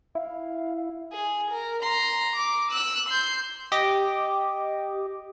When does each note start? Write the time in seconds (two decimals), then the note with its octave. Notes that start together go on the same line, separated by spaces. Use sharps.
0.15 E4 F5
1.13 G#4
1.51 A#4
1.82 A#5 C6
2.36 D6
2.72 E6 F#6
3.09 C6 G6
3.72 G4 D#5 D6